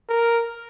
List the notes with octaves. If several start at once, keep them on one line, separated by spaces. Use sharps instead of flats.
A#4